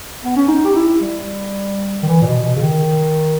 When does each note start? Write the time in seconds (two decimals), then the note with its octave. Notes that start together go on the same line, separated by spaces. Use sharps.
0.24 B3
0.36 C#4
0.48 D#4
0.65 G4
0.75 E4
1.01 G3
2.03 D#3
2.08 E3
2.22 A#2
2.26 B2
2.43 B2
2.56 C#3
2.62 D#3